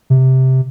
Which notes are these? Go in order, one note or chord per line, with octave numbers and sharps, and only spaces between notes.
C3